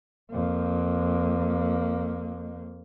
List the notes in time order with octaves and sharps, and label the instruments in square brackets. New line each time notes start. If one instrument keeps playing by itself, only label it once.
[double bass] F2 A#3